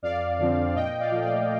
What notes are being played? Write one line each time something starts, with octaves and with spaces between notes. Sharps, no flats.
F2 D5 F5
D3 F3 C4
A#2 D#5 G5
D5 F5
F3 A3
D5 F5